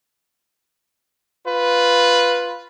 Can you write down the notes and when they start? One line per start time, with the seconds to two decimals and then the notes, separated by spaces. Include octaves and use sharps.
1.45 F4 B4